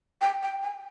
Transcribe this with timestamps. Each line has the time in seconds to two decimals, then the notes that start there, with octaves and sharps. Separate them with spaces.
0.21 G5
0.43 G5
0.63 G#5